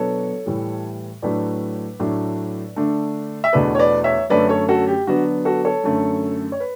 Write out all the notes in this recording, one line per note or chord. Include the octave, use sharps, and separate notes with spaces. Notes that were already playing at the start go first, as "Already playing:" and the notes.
Already playing: B2 F#3 B3 D4 A4 C#5
A2 E3 G3
A2 F#3 A3 D4 B4 D5
A2 F#3 A3 D4
D3 A3 D4
E5
E2 B2 A3 D4 B4 D5
C#5
B4 D5
C#5 E5
F#2 D3 A3 C#4 B4 D5
A4 C#5
F#4 A4
G4
D3 F#3 B3 D4 F#4
F#4 A4
A4 C#5
F#2 D3 A3
C#5
B4